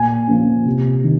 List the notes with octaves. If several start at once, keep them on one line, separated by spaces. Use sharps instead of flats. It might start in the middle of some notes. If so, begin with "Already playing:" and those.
Already playing: A#2 G#5
F3 A#3 C#4
C3
D#3